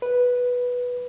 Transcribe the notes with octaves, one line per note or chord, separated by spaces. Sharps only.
B4